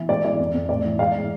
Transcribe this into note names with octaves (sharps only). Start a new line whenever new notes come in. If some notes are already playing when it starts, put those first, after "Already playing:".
Already playing: E3
G#2 D5
E3 D5
F2
F2
A2 D5
E3
G#2 D5 F5
E3